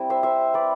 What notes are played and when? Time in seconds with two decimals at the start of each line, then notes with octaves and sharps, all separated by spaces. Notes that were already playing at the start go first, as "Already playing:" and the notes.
Already playing: G3 C4 E4
0.10 C5 E5
0.23 C5 E5
0.54 B4 D5